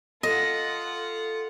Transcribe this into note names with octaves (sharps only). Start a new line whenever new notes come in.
F4 A4 D#5 F#5